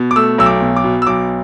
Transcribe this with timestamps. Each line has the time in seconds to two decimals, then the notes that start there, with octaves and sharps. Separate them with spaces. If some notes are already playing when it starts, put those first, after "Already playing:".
Already playing: B2
0.11 D6
0.16 A3 E6
0.38 B1 E6
0.46 D6
0.62 B2
0.76 D6
0.84 B2
1.02 E6
1.07 B1 D6